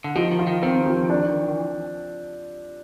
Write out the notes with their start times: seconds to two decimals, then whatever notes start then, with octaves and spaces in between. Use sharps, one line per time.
0.04 D3
0.15 D#3 F3
0.31 D#3
0.39 F4
0.47 D#3
0.62 D#3 C4
0.86 F3
1.10 D4